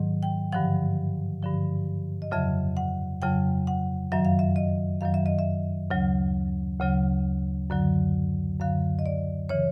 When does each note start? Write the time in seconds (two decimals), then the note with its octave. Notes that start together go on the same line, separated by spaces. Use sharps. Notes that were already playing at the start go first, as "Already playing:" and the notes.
Already playing: G#2 D#3 F#3
0.23 G5
0.52 G2 D3 F3 F#5
1.43 G2 D3 F3
2.22 D#5
2.31 F2 C#3 F#3 E5
2.77 F#5
3.22 F2 C#3 F#3 G5
3.67 F#5
4.12 F#2 D#3 F#3 E5
4.25 F5
4.39 E5
4.56 D#5
5.01 F#2 D#3 F#3 F5
5.14 E5
5.26 D#5
5.39 E5
5.91 D2 C#3 F#3
6.80 D2 C#3 F#3
7.70 F#2 D3 F#3
8.60 F#2 D3 F#3 F5
8.99 D#5
9.06 D5
9.49 C#3 E3 C#5